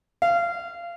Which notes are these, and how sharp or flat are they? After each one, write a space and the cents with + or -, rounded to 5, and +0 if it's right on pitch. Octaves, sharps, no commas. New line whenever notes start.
F5 -25